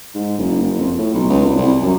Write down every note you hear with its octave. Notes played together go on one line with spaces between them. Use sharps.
G#2
F#1
F#1
F2
A2
B1
C#2
C2
C2
F#2